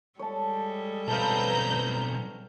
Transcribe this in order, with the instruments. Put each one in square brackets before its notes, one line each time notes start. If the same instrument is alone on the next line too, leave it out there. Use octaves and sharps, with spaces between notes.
[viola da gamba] G3 G#3 A4 [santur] C#5 A5
[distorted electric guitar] B1 C4 [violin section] B4 A#5 G6 [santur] F5 G5 A5